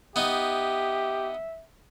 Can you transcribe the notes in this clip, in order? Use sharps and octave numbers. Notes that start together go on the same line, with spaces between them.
B3 D#4 G4 E5